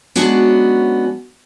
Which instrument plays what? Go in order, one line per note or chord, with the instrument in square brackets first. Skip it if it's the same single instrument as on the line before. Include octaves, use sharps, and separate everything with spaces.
[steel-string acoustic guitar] F#3 G#3 B3 C#4 D4 F#4